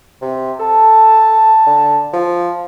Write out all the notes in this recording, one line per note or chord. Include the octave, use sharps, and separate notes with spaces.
C3
A4 A5
D3
F3